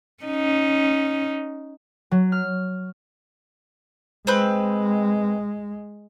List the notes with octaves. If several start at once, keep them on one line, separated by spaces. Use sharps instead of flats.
C#4 D#4
F#3
F6
G#3 C4 B4